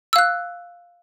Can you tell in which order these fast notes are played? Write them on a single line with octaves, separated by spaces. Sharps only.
E6 F5 F#6